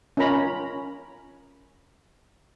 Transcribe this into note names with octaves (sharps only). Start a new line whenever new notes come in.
C#4 F4 A#4 A#5 B5